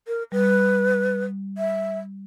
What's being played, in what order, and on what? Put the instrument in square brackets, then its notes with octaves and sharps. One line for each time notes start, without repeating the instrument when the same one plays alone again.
[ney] A#4
[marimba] G3 [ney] B4
[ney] E5